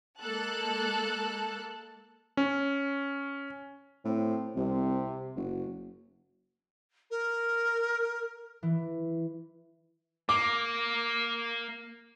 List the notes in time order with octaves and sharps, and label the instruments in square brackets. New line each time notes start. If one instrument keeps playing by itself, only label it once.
[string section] G#3 A#3 A4 A5 F#6
[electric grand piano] C#4
[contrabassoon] A2 [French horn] C4
[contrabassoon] C2 [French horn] C3
[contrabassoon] F#1 [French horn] F#4
[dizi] A#4
[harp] E3
[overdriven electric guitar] A#3 [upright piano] D6